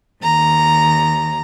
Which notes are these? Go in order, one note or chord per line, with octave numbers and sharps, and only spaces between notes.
D#2 A#5